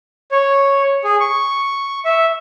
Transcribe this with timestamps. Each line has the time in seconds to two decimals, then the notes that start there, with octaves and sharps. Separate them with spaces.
0.32 C#5
1.04 G#4
1.20 C#6
2.05 E5